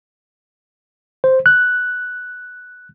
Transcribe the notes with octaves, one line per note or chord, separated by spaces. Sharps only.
C5
F#6